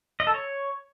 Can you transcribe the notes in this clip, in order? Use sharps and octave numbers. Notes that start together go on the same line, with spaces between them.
D#5
A4
C#5